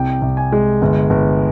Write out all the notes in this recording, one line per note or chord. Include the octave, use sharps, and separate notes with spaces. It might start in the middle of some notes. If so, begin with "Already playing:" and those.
Already playing: C2 G5
C2
G#5
G#3
G1
G1